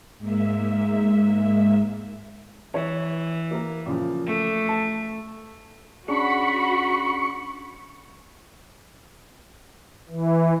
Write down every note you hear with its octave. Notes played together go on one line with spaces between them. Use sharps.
G#2 G#3 A#3 E5
E3 C#5
A#3 A#4
A#2 C#3 F3
A3
A5
C#4 D4 F#4 G#4 B5 C#6
E3